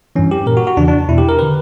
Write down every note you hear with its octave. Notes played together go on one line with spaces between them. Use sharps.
G2 E3 C#4
G4
A#2 A#4
F#4
F#4
E2 C#3 E3 D4
D4
E2 B2 E4
G4
A#4
D3 B4